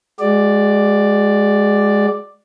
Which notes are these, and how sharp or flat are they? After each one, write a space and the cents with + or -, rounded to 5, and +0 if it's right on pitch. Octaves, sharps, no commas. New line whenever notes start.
G#3 +0 F#4 +40 D5 +5